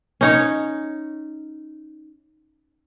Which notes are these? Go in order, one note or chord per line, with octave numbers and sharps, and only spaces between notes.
C#4 D#4 C#5